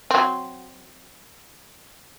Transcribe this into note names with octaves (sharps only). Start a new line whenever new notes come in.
F#3 C4